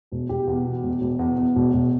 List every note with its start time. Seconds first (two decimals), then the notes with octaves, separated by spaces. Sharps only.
0.12 E1
0.29 E1 G4
0.47 E2
0.65 B2
0.83 E1
1.01 E1
1.19 E2
1.38 E2
1.56 E1
1.73 E1